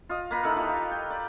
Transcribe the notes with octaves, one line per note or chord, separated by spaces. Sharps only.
F4 D#5
A#3 B4 A#5
D#4 E4 A4 F#5
D#4 F4 G4
G5
D5